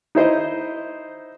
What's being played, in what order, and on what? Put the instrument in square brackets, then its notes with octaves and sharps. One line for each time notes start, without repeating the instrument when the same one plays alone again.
[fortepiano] D#4 E4 C5 D#5